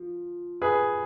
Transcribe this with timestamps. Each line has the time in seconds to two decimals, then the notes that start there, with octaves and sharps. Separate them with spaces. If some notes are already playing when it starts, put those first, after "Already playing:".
Already playing: F3
0.62 G#4 B4